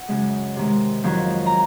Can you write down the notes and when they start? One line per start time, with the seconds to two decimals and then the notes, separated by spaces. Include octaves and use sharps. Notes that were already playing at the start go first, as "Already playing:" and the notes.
Already playing: F#5
0.08 F#2 C#3 G#3
0.56 C3 D#3 G#3
1.03 F2 D#3 F#3
1.46 A#5